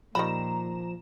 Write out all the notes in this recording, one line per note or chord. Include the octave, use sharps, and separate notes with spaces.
A#2 D#3 F3 G3 A#5 B5 E7